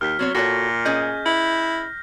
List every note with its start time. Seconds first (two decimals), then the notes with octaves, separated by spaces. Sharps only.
0.01 D#2 F6 B6
0.19 F#3 B3 C4 C#5
0.35 A#2 F#4 A4 C#5 A#6
0.85 C#4 G#4 D#5 G6
1.26 E4